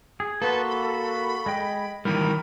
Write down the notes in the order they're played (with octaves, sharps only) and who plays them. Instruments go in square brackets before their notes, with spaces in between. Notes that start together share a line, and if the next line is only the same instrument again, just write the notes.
[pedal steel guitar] G#4
[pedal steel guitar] A#3 F#4 C6 [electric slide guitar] A4 [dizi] B4
[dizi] B5
[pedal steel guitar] G#3 D#5 G5
[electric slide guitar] D#3 E3 G3 [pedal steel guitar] A#4 [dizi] B5